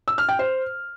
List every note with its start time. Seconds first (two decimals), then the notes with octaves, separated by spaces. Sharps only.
0.08 E6
0.18 F6
0.29 G5
0.39 C5